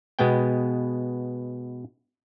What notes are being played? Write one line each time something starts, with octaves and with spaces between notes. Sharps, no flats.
B2 G#3 B3 G5